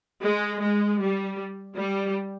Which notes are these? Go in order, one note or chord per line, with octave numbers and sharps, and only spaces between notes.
G#3
G#3
G3
G3